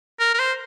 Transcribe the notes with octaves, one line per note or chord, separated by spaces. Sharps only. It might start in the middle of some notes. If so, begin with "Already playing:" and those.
A#4
A#4
C5